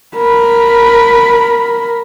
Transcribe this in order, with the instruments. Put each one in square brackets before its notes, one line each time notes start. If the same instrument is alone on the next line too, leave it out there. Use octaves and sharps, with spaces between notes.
[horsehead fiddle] A#4 B5